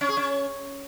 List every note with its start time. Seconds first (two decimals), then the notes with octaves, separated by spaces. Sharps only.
0.01 C#4
0.09 G#4
0.17 C#4